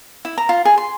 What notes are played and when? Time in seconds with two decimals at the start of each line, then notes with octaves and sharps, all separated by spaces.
0.25 E4
0.38 A#5
0.49 F4
0.65 G#4
0.78 C6